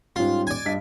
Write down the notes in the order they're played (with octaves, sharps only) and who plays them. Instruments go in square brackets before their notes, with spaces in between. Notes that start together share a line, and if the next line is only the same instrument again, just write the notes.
[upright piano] G#2 G3 C#4 [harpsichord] F4
[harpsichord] D5 G#5
[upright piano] G2 D#5 B6